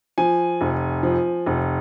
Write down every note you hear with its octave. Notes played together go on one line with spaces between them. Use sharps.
F3 G#5
F1
F3
F1